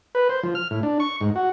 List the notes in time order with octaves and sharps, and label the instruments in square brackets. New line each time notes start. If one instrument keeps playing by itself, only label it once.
[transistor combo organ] B4
C5
F3
F6
A2
D4
C#6
G#2
F#4